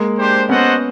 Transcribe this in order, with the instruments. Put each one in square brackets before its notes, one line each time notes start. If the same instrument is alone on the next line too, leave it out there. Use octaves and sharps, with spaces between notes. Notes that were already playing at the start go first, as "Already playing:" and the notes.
Already playing: [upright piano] G#3 A#3
[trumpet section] D4 G4 C5
[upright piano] B3 C#4 [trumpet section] F#4 A4 C5 D#5 F#5